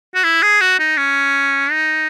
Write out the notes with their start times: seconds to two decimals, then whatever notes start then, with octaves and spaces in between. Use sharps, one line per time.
0.15 F#4
0.24 E4
0.43 G#4
0.61 F#4
0.79 D#4
0.97 C#4
1.71 D#4